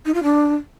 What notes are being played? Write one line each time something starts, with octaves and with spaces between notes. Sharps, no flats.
D#4
F4
D4